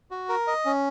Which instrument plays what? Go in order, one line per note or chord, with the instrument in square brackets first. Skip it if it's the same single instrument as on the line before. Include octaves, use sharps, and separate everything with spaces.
[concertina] F#4
A#4
D#5
C#4